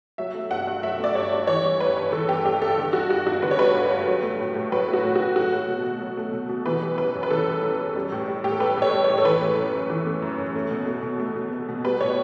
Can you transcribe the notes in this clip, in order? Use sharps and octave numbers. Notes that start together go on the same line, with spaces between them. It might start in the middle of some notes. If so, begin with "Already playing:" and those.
F#3 E5
A3
G2 F#5
G2
F#3 E5
A3 D5
G2 C#5
G2
E3 C#5
G3
G2 B4
G2
E3 A4
G3 G4
G2 G4
G2 A4
D3
G3 F#4
G2 F#4
G2 F#4
D3 B4
C#5
G3 B4
G2
G2
F#3
A3
A2
A2
F#3 B4
A3
F#4
A2
A2 F#4
F#3 F#4
A3
B2
B2
F#3
A3
B2
B2
E3 B4
G3
F#2 B4
F#2
B4
E3 A4
G3
F#2
F#2
G3
A2
G3
A2 G4
A4
G3 B4
A2 C#5
G3
A2 C#5
A4
E3 B4
A3
F#2
F#2
E3
A3
F#2
F#2
A3
B2
A3
B2
A3
B2
A3
B2
G3 B4
A2 C#5